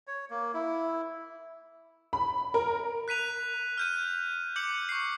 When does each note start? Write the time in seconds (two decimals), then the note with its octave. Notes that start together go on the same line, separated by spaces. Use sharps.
0.07 C#5
0.30 A#3
0.54 E4
2.13 B5
2.54 A#4
3.08 F#6 B6 D#7 F7
3.77 F6 G6 D#7
4.56 D6 G6 C#7 F#7
4.89 C#6 C7